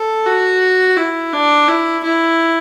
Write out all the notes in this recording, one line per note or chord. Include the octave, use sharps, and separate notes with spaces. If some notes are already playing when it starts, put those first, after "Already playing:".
Already playing: A4
F#4
E4
D4
E4
E4